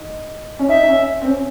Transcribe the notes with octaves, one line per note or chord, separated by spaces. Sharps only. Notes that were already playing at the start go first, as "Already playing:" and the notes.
Already playing: D#4
C#4
D#4 E5
D#4
C#4
C4
C#4